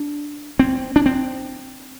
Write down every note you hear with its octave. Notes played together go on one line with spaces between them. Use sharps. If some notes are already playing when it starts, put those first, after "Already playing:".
Already playing: D4
C4
D4
C4